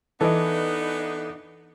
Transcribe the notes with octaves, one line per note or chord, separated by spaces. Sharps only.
E3 B3 D4 D#4 A4 D#5